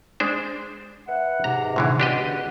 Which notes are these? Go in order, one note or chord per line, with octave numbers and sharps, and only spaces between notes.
G#3 D4 C5
B4 E5 F#5
G#2 C3 A#5
A2 D3 E3
C#2 B2 D4 G4 D#5 F#5